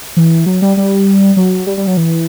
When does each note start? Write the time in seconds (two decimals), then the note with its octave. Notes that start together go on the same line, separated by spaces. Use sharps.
0.17 E3
0.46 F#3
0.62 G3
0.77 G3
1.37 F#3
1.67 G3
1.77 G3
1.87 F#3
1.97 E3